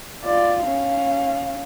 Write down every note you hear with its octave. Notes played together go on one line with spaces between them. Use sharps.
F4 D5
C#4 F5